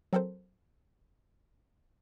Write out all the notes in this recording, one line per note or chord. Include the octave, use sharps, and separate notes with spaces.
F#3 C4 A4 A#4 C5